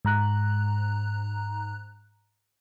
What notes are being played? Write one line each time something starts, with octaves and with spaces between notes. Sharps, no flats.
G#2 A#5 F#6